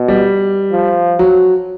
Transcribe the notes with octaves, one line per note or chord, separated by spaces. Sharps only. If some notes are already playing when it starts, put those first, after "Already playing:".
Already playing: B2
G3
F3
F#3